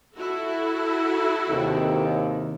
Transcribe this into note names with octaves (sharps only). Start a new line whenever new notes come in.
E4 F#4 A4
D#2 C3 D#3